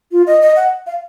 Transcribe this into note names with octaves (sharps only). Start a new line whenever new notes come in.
F4
D#5
D#5
F#5
F5